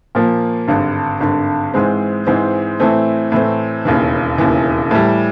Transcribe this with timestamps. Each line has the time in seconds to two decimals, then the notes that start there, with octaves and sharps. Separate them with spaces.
0.15 A#2 F3 A#3
0.68 G#1 G2 D3
1.20 G#1 G2 D3
1.74 G#2 E3 G#3 C4
2.27 G#2 E3 G#3 C4
2.80 A2 E3 A3 C4
3.32 A2 E3 A3 C4
3.85 E1 D#2 C#3 E3
4.38 E1 D#2 C#3 E3
4.91 A2 E3 G3